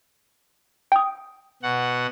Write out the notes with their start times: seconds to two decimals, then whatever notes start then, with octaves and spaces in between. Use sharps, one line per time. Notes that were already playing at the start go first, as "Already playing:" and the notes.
0.92 G5 D#6
1.62 B2 F#5